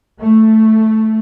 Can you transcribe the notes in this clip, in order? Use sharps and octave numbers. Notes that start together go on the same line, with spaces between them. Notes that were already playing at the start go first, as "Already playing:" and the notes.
A3